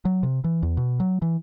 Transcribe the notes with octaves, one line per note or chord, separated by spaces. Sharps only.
F#3
C3
E3
E2
B2
F#3
E3